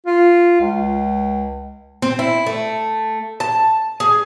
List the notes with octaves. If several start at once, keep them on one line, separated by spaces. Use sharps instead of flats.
F4
C#2
C4
E4
A3
A5
G#4